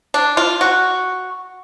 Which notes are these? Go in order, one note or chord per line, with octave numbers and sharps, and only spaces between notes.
D4
F4
F#4